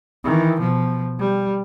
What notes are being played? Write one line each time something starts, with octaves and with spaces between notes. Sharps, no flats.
D#3 E3
B2 F3
G3